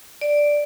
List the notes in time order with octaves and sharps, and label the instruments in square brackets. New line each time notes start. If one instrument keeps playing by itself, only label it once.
[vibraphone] D5